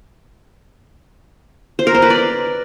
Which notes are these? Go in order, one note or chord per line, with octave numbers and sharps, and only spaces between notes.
C5
A#4
C5
B4
D5